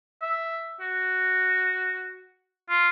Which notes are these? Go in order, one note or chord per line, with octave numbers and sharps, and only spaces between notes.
E5
F#4
F4